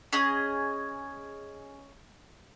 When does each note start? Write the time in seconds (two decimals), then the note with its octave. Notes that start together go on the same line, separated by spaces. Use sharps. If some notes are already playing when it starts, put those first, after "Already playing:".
0.13 C#4 G#4 D#5